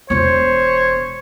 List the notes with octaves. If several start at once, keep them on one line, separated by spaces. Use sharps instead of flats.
E1 B3 C5 C#5